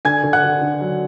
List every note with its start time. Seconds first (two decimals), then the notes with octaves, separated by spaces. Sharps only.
0.05 D3 G#5 G#6
0.23 D3
0.33 F#5 F#6
0.43 D3
0.62 D3
0.81 F#3